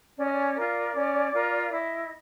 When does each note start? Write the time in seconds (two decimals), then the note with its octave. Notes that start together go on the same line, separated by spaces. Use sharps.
0.18 C#4 D5
0.25 D#5
0.33 D5
0.56 F4 A#4
0.94 C#4
1.33 F4 A#4
1.71 E4 D#5